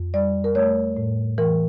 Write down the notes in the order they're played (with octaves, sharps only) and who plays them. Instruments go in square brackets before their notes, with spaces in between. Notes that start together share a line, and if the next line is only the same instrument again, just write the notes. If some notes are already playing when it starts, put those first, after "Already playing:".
Already playing: [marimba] F2
G3 D5
A#4
A3 C#5
A2
E3 A#4